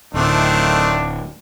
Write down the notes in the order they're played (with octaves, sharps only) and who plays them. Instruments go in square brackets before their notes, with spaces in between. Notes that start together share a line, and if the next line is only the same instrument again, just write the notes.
[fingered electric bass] D1 [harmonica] D#3 A3 C4 [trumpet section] D4